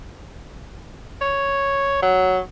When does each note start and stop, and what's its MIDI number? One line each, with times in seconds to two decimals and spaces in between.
1.22 1.98 73
2.02 2.39 54